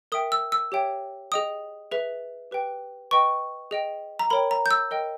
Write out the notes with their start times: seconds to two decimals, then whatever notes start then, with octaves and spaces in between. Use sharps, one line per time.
0.12 A#4 E5 G5 D#6
0.32 E6
0.52 E6
0.72 G4 C#5 E5 G5
1.32 G#4 D#5 G5 D#6
1.91 G#4 B4 E5
2.51 G4 B4 G5
3.11 B4 D#5 G5 C#6
3.71 G#4 D#5 G5
4.19 A#5
4.30 A#4 C#5 G5 B5
4.51 A#5
4.66 G6
4.71 E6
4.91 A#4 D#5 G5